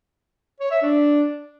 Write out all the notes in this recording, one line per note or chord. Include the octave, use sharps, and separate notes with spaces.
C#5
E5
D4